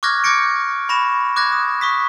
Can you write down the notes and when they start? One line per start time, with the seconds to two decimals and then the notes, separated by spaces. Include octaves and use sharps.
0.03 C#6 D6 F6 F#6 G#6 A#6
0.24 D6 G6 G#6 A#6 C#7 D7
0.89 B5 C#6 A#6 E7
1.36 D6 F#6 G#6 A#6
1.52 D#6
1.81 C#6 D#6 B6